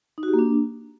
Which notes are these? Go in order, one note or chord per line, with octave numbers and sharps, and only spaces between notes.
D#4
F#4
G4
A#3
D4